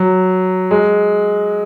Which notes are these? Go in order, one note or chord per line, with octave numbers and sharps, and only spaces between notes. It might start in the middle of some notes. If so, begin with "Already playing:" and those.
Already playing: F#3
G#3